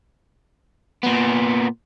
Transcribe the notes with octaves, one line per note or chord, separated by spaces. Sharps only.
A#2 B3